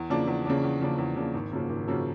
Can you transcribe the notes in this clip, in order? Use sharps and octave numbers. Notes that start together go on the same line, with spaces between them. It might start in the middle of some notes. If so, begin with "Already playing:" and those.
Already playing: E2
C#3 F3 A#3 D4
E2
C#3 F3 A#3 D4
E2
C#3 F3 A#3 D4
E2
C#3 F3 A#3 D4
G#1
F#2 C#3 F3 A#3
G#1
F#2 C#3 F3 A#3